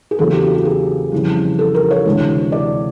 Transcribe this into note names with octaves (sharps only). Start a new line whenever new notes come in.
G#4
E2 C#3 F#3 A#3 A4
G4
F#4
G4
G#4
F2 C#3 E3 G3
A4
A#4
C#5
D2 C3 E3 G#3
D5